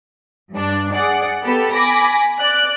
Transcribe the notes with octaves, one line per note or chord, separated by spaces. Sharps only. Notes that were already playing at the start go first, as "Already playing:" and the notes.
G2 D4
G#4 D5 F#5
B3 G4 A4 B4 A5
G#5 B5 D6 A#6
D5 F#6